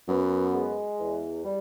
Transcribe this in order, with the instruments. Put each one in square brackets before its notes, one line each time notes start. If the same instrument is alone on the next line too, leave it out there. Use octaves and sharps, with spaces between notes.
[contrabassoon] F#2 [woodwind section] B3
[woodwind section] G#3
E2
G3